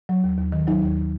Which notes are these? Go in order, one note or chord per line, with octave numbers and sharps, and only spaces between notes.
F#3
D#2
D#2
D#3
F#3 D#4
D#2